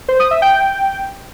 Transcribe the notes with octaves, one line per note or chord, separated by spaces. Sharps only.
C5
D#6
E5
G5